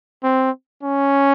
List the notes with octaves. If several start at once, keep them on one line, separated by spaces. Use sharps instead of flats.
C4
C#4